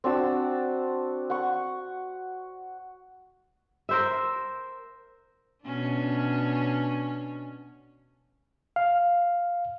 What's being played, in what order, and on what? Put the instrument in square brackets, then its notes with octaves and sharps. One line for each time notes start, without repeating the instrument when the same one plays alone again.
[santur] C4 D4 F#4 E6
F#5 C#6
[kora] A#4 C5 E5
[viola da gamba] B2 C#4 D4
[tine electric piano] F5